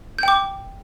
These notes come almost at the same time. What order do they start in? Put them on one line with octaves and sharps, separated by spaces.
G6 G5 D6